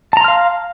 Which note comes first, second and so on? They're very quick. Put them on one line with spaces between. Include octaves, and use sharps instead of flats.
A5 A#5 C6 F6 F5